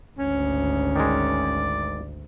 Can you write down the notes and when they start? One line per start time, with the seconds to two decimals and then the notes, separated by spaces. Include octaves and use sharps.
0.18 G#1 D2 C#4
0.96 D#3 G#3 D5